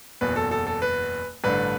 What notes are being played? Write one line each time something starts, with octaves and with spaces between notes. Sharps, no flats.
F#1 E2 B2 B4
A4
A4
A4
B4
A1 G2 D3 B4